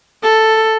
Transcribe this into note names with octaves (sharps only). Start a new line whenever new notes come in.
A4